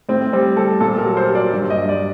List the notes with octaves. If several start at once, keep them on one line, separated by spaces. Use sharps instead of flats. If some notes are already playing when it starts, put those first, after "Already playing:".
A2 C4
G3 C4
G3 A4
A#2 A4
A#4
F#3
C5
F#3
D5
G2
D#5
G2
D5